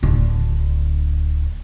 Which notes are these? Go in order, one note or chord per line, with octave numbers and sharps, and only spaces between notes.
D1 D3